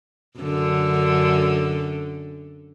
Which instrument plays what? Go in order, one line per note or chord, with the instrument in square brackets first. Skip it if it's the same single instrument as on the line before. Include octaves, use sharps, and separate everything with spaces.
[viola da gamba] F#2 D3